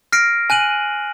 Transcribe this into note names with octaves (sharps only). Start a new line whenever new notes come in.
F6 A#6 C7 D7
G#5 F#6 D#7 F#7